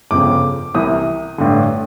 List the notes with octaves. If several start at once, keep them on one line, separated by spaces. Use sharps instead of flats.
G1 F2 C#3 D6
C2 C3 E3 D#6
A1 G2 D3